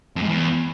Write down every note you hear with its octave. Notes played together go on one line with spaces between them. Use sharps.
F2
G#2
E2